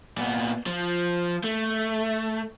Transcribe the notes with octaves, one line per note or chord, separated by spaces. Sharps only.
A#2 B3
F3
A3